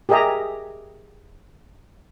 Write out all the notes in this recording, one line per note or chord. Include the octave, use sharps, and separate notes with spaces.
G4 G#4 A#4 D#5 E5 A#5